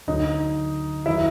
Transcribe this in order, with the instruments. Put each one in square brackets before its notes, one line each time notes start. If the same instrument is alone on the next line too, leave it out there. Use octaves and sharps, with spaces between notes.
[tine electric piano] D2 D3 F#3 [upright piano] D#4
[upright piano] E4
[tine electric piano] D#3 F#3